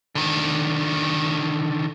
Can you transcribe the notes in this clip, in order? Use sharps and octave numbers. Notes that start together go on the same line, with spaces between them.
D3 D#3